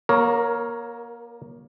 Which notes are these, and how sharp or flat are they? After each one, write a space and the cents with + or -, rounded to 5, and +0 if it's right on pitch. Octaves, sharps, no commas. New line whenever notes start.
A#3 +35 A#4 +0 C#5 +0